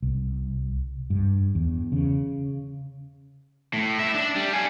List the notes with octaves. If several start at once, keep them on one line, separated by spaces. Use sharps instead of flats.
C2
G2
E2
C#3
A2
A2 E5
D4
G3
F5 G#5